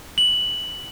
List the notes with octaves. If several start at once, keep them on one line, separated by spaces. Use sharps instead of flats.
F#7